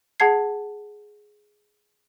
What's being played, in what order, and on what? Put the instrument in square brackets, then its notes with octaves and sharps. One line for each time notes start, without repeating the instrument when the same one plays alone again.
[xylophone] G#4 F#5 A5 G#6 C7